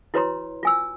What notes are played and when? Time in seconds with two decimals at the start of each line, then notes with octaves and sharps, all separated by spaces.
0.14 E4 F#4 B4 C#5 A#5 C6
0.63 F4 G#5 E6